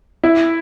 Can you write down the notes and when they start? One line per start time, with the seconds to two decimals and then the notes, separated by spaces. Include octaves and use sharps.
0.24 E4